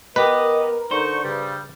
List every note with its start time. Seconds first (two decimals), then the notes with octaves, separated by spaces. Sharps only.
0.16 B3 G4 A#4 B4 D#5
0.91 D3 D#4 C5 C#6
1.24 G2 C#3 G3